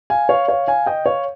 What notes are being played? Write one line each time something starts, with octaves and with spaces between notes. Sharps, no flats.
F5 G#5
C#5 F5
C#5 F5
F5 G#5
D#5 G5
C#5 F5